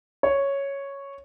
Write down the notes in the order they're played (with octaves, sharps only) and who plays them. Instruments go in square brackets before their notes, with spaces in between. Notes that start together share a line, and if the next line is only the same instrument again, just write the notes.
[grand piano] C#5